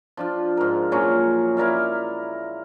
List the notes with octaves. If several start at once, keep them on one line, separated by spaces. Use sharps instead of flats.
F3 D4 F4
G#2 A#4
A#2 F3 F#3 C#4
E4 A#4 D5 F5